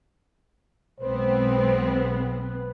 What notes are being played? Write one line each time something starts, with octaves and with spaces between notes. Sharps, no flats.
B1 G#3 B3 C4 B4 C5